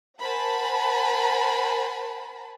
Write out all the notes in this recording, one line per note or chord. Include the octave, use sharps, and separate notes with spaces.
A#4 C5 F#5 G#5 A5 B5